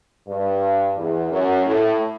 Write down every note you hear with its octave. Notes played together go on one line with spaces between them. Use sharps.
G2
E2
F#2
A2